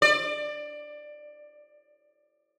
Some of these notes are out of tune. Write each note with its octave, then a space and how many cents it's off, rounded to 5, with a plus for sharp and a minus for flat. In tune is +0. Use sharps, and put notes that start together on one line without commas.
D5 +20